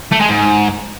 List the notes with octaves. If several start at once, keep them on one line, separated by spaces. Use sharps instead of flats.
A3
G#3
G#2